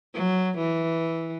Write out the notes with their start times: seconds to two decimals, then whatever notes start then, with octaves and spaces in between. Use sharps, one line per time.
0.14 F#3
0.58 E3